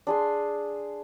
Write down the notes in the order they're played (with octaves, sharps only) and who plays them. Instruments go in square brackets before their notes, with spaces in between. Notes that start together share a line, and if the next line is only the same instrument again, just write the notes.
[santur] D4 G#4 C6